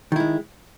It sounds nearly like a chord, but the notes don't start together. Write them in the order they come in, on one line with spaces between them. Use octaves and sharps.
D#3 E4 G#3